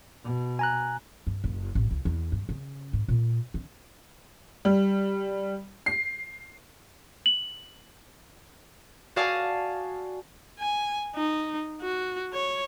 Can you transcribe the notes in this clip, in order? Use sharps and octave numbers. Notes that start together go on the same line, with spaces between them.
B2
G#5 A#5 F#6
G2
F#1
A1
C#2
E2
G2
C#3
G#2
A#2
D3
G3
C7
F#7
F#4 D5 F5 G#5 A5 D#6
G#5
D#4
F#4
C#5